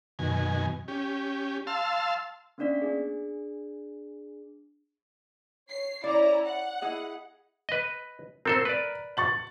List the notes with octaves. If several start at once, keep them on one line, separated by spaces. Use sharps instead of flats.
F#2 B2 D#3 G#5
C#4 G4
F5 A5 C6 E6
A#3 B3 C#4 D4 D5 B6
D4 G#4
C#5 C7
C#4 E4 D5 A#5
F#5
E4 G#4 D#5
B4 D#5
C4 A4 A#4 C5
B4 D5
C#6 A6 F#7